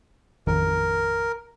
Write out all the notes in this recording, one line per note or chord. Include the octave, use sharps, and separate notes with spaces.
A1 F2 D#3 A#4